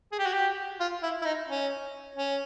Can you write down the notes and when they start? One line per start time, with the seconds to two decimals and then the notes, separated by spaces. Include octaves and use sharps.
0.12 G#4
0.19 G4
0.26 F#4
0.33 G4
0.80 F4
1.03 E4
1.22 E4
1.26 D#4
1.48 C#4
2.16 C#4